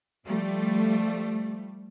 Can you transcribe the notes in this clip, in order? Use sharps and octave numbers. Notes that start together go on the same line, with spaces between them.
F3 G3 A3